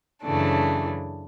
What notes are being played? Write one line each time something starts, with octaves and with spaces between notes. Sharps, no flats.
F#2 C#3 E3 A3 D4